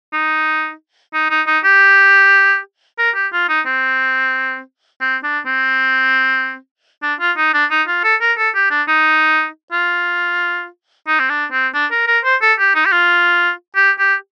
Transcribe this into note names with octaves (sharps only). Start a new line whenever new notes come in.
D#4
D#4
D#4
D#4
G4
A#4
G4
F4
D#4
C4
C4
D4
C4
D4
F4
D#4
D4
D#4
F4
A4
A#4
A4
G4
D4
D#4
F4
D#4
C4
D4
C4
D4
A#4
A#4
C5
A4
G4
D#4
G4
F4
G4
G4